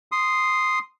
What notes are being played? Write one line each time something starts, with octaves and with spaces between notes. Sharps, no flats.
C6 D#6